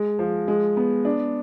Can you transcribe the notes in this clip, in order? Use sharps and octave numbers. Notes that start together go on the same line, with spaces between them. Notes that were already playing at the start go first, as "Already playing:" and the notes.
Already playing: G#3
F3
G#3
B3
D4